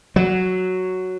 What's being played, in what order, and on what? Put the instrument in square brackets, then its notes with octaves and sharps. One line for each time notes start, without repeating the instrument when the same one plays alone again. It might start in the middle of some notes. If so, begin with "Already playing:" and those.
[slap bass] F#3